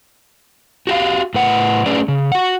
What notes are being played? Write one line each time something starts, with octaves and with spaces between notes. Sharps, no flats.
F#4 G4 F5
A2 B4 F#5
A3 C#4 G#4 B4 D5
C#3
F#4 F#5